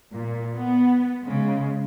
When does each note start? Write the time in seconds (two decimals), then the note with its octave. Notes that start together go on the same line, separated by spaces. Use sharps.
0.13 A#2
0.54 B3
1.22 C#3 G#3